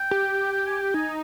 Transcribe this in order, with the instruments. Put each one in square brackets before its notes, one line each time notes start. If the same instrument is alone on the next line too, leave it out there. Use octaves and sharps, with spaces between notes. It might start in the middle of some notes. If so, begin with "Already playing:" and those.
Already playing: [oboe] G5
[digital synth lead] G4
[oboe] G5
G#5
G5
[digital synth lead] D#4 [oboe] G#5